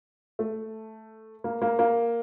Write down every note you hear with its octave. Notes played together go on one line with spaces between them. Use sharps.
A3
A#3
A#3
A#3